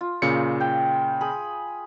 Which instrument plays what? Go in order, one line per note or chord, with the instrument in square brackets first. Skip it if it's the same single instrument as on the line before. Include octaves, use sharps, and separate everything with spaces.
[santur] F4
[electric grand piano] A#2 C#3 C#7
[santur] G5
G#4 B5